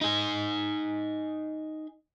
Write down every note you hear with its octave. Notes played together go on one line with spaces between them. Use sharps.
D#4 G#4